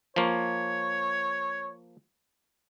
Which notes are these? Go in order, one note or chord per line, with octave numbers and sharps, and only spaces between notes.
F3 A#3 C#5